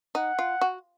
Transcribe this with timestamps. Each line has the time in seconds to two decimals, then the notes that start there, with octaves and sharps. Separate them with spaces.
0.15 D#4 F#5
0.39 F4
0.61 F#4